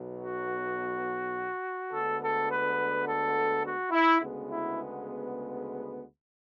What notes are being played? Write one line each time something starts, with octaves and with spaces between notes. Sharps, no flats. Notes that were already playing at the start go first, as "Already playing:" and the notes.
Already playing: B1 B2 F#3 B3
F#4
D2 D3 G#3 B3 A4
A4
B4
A4
F#4
E4
D2 C#3 G#3 B3
E4